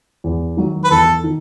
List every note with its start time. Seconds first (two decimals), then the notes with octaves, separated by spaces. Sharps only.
0.24 E2
0.57 D#3 F#3
0.84 B4
0.90 E2 A4
1.24 D#3